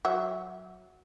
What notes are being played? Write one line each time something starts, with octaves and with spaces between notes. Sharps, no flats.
F#3 E5 F#5